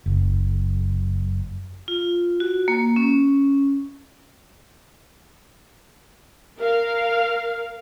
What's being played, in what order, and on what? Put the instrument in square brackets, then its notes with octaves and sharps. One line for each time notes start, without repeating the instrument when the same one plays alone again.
[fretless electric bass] F#1
[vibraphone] F4
F#4
A#3
C#4
[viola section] A#4 F5